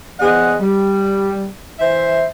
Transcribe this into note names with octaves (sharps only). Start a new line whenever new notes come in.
E2 G#4 C5 D#5 F#5
G3
E3 C5 E5